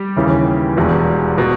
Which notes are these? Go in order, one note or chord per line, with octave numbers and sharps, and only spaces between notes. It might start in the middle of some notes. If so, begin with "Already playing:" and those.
Already playing: G3 G4
D#2 C#3 E3
E1 E2 B2
B2